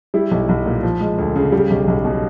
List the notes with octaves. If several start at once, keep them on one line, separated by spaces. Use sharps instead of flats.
G3 E4
B1
B1
A#2
F3
G#3
D2
C#3
G3
B1
B1
B2